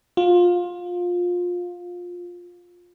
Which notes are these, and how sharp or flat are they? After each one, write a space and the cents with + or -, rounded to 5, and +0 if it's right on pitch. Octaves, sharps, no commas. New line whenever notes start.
F4 +20